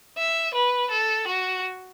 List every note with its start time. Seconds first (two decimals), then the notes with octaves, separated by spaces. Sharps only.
0.18 E5
0.54 B4
0.91 A4
1.28 F#4